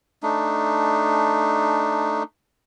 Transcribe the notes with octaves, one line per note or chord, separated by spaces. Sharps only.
A3 D4 D#4